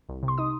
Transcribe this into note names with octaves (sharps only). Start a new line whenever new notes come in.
C2
C3
C6
D#4 D#6